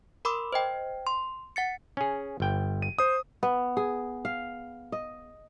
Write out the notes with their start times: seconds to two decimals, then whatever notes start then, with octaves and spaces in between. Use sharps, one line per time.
0.25 A#4 B5 C6 D6 E6
0.53 C5 D#5 G5
1.07 C6
1.56 F#5 A6 C#7
1.97 C#4 G#4
2.40 G1 G5
2.82 D#7
2.99 C5 D#6
3.43 B3
3.77 G#4
4.25 F5
4.92 D#5